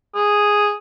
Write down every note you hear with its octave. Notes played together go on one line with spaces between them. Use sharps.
G#4